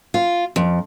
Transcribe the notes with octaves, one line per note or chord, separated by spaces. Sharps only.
F4
F2